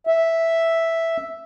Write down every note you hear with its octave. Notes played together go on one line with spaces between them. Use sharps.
E5